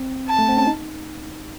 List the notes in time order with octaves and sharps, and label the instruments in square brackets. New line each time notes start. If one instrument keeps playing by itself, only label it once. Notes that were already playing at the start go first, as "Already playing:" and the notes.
Already playing: [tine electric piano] C4
[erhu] A5
[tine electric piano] A3
C4
C#4
D#4